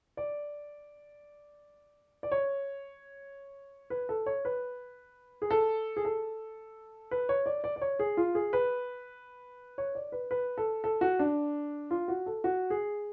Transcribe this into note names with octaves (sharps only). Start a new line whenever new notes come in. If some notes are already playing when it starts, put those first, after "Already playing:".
D5
D5
C#5
B4
A4
C#5
B4
G#4
A4
G#4
A4
B4
C#5
D5
D5
D5
C#5
G#4
F4
G#4
B4
C#5
D5
B4
B4
A4
A4
F#4
D4
F4
F#4
A4
F#4
G#4